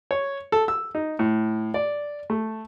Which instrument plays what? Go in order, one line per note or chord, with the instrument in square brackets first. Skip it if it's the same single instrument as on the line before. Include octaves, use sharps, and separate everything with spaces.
[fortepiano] C#5
A4
E6
D#4
A2
D5
A3